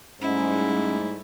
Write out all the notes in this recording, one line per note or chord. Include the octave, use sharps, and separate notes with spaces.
G#2 G3 A3 C#4 E4